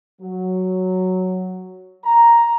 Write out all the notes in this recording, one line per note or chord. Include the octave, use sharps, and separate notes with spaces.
F#3
A#5